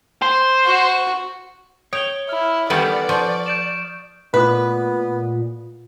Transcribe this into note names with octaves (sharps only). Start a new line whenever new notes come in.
C5
F#4
C#5 G5 D#6 F7 G7
E4 F6
D#3 E3 G3 A4 B4 D5 F#5
F3 C#6
G6 D7 E7
A#2 A3 B3 F4 B4 D#6